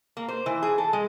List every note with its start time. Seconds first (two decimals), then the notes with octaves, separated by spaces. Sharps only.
0.17 A#3
0.28 C5
0.46 E3
0.63 G#4
0.78 A4
0.93 G#3